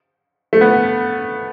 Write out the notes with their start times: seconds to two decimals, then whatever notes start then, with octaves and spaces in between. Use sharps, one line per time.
0.53 A3
0.61 B3